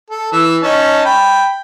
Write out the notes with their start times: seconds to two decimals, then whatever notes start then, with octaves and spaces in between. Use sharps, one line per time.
0.10 A4
0.32 E3 E6
0.63 C#4 D#4 A5
1.05 G5 B5